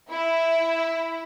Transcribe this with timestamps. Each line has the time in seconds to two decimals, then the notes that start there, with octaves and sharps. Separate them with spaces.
0.10 E4